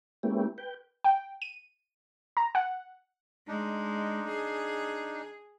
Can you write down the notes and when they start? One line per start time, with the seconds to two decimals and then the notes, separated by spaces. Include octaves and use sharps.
0.23 G#3 A#3 B3 C#4 E4 G4
0.58 B4 G5
1.04 G5
1.42 D#7
2.37 A#5
2.55 F#5
3.48 G#3 D4 D#4
4.28 G#4